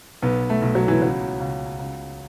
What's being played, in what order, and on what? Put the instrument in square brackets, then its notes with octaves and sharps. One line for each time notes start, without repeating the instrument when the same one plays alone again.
[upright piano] B1 B3
A3
B1
F#3
E3
C#2 F#3
C#2
C#2